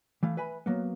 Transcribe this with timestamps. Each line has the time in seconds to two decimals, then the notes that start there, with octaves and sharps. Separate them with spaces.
0.23 E3 A3 F5
0.37 B4 E5 G#5 B5
0.66 F#3 A#3 B3